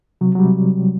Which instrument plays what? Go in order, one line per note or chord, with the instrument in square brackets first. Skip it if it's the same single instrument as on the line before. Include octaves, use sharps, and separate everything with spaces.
[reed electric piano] C3 F#3
F#3
G3
C3